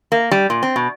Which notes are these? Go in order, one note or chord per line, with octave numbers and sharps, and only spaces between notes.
A#3
G3
A#2
C4
B2